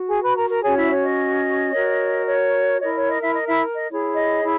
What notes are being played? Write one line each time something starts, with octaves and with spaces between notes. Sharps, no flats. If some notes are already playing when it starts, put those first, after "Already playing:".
Already playing: F#4
G#4 G#5
B4 B5
A#4 A#5
A#4 A#5
C#4 F#4 G#4 C#5 G#5
E4 E5
C#5
D#5
F#4 A#4 C#5
C#5
E4 A#4 C#5 D#5
C#5
D#5
E4 E5
D#5
E4 E5
D#5
E4 G#4 C#5
D#5
E4